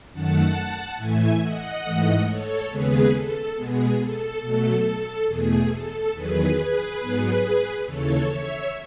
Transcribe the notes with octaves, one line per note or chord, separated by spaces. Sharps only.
F#2 D#3 A3 F#5 A5
A2 E3 A3 E5 G#5
D#5 F#5
G#2 E3 A3
A4 C#5
D#2 C#3 G#3 B3 G#4 B4
A4
B2 G#3 B3 G#4
A4
B2 F#3 A3 A4
A4
E2 B2 A3 G#4
A4
E2 D#3 F#3 G#4 B4
G#4 B4
G#2 F#3 B3
D#2 C#3 E3 A4 C#5
C#5 E5